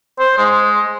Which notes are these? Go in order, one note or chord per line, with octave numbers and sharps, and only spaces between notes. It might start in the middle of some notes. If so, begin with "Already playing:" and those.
C5
G#3